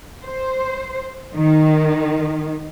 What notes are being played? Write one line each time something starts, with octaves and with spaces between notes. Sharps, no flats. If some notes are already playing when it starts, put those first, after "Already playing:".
C5
D#3